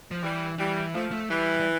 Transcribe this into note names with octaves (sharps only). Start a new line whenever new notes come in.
F3
E3 G3
E3 G3
F3 A3
A3
E3 G3
G3